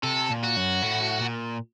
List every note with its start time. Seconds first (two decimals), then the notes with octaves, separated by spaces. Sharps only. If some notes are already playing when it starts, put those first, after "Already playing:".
0.03 C3 A4
0.30 A#2
0.43 F#4
0.56 F#2
0.82 A2
1.21 A#2